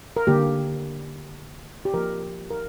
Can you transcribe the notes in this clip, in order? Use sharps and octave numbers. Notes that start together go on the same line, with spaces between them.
A#4
D3 A#3 G4
G4
F3 A#3 A#4
A#4
A#4